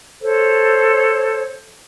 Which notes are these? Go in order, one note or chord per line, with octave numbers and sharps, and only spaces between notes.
A4 C5 C#5